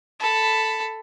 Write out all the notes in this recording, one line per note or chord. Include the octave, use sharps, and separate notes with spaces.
A4 B5